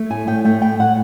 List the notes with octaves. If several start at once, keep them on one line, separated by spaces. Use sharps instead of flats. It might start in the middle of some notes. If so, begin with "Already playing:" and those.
Already playing: A3
A2 G#5
A2 G5
A3 G5
A2 G5
A2 F#5